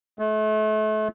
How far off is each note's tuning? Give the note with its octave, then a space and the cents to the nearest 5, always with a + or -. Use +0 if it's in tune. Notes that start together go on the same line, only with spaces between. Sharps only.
A3 -35